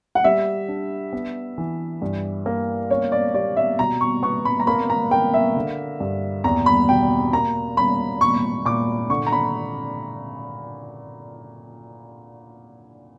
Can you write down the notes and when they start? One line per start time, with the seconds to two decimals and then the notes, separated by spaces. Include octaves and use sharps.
0.15 F#5
0.24 G3 E5
0.69 D4
1.13 B3
1.58 E3
2.02 G2
2.46 A#3
2.90 C#4 C#5
3.12 D5
3.34 G4 D5
3.57 E5
3.79 B2 A#5
4.01 C#6
4.23 B3 C#6
4.45 B5
4.60 A#5
4.67 A#3 B5
4.90 A#5
5.11 A#3 G5
5.34 E5
5.56 D3
6.00 G2
6.44 E2 A#5
6.66 B5
6.89 B2 G5
7.33 A#3 A#5
7.77 C#4 B5
8.21 A#2 C#6
8.65 A#2 D6
9.10 D3 C#6
9.27 A#5
9.32 B5